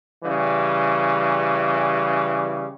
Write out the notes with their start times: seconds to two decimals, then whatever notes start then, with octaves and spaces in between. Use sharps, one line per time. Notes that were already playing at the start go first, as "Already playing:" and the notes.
0.24 C#3 E3 G3